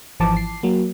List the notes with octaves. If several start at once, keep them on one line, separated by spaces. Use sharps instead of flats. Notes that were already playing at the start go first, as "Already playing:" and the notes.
G#1 E3 F3 A5 D6
C7
F#3 A#3